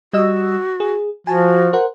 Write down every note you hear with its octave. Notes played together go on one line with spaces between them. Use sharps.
G3 F#4 D#5 E6
G#4
F3 F#4 G#5 A5
A#4 C5 F#5